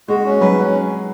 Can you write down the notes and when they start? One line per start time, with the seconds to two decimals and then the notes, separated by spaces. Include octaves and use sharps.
0.08 G#3 F#4
0.25 C#4
0.41 F#3 B4
0.57 C#4